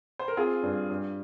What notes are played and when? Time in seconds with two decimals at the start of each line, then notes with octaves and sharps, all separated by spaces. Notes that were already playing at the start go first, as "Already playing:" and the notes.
0.19 C5
0.28 A#4
0.37 C4 F4 G#4
0.63 G2
0.90 G2